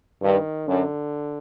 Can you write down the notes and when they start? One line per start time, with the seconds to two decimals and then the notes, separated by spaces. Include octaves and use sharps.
0.22 G2 D#3
0.67 F#2 D3